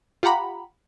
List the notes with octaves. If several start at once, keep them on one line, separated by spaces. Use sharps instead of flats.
F4 G4 F#5 A#5 B5